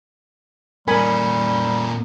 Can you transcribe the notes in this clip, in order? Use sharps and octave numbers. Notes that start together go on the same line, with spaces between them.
A#2 G3 C#4 A#4 G#5 B5